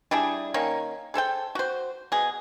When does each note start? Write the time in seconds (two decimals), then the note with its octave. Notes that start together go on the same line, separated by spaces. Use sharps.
0.11 G3 D4 E4 G#4
0.54 D#3 A#3 C#4 C#5
1.14 G#4 A4 C5 G5
1.55 F#4 C5
2.12 B2 G#4